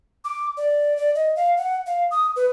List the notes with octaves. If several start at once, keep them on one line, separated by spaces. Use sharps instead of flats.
D6
D5
D5
D#5
F5
F#5
F5
D#6
B4